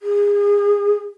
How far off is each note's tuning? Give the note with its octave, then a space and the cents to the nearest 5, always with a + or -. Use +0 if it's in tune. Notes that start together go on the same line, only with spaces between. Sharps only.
G#4 -30